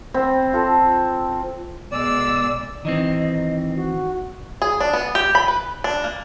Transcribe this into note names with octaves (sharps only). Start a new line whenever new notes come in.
C4 B5
F4 A4 A#5
B2 G#3 D5 E6
D#3 E3 C4 D#5
F#4
G#4
D4
B3
G4
B5
B4
D4
A#3